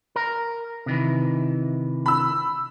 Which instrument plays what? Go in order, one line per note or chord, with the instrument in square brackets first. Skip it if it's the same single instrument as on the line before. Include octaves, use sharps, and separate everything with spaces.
[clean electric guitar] A#4
C3 D#3 E3
[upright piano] B5 E6